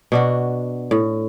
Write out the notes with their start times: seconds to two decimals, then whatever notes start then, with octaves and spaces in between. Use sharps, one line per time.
0.12 B2 D4 F#4
0.91 A2